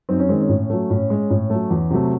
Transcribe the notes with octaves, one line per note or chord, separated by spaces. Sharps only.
F#2 C4 D#4
C#4
D#3 G#3 C4
C#4
A2
F#3 A3
A2 C#4
G#3
A2
F#3 A3
E2
C3 F#3 A3